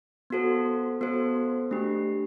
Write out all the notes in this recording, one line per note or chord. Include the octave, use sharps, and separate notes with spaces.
B3 F#4 A4 C5
B3 F#4 A4 C5
A3 D4 G4